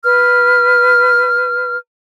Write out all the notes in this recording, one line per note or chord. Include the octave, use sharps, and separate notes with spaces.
B4 F6